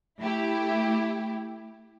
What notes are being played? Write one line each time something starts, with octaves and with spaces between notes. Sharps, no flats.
A3 E4 G4